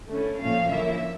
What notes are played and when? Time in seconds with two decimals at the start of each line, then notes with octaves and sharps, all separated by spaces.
0.09 D3 A3 C#4 E4
0.39 A#2 F3 A3 C#4 F5
0.69 D3 F3 A#3 C#4 E4 E5